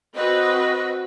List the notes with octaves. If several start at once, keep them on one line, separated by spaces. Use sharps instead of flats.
C4 F#4 B4 D#5